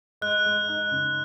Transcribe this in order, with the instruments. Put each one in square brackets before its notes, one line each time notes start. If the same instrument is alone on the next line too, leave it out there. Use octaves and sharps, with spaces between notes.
[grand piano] G#3 [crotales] F#6
[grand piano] G#3
D#4
C#3